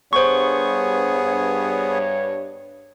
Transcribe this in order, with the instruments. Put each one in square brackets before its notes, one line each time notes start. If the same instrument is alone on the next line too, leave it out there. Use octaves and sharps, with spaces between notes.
[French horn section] G2 C#5 [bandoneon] B3 G#4 [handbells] C5 C#6